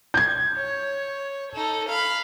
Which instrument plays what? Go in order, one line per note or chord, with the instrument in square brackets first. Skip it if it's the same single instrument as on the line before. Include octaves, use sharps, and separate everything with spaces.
[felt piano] G6 G#6
[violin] C#5
D#4 A4
F5 B5